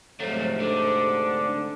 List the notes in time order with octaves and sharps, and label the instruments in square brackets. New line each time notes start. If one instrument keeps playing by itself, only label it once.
[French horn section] G#2 C3 C5 [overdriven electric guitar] F3 F#3 [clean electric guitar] A3
[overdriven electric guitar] D3 [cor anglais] D4